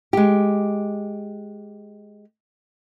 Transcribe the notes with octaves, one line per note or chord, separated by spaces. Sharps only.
G#3 G4